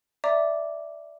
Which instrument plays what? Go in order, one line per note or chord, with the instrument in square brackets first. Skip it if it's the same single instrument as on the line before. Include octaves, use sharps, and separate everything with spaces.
[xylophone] D5 E5 A#5 D6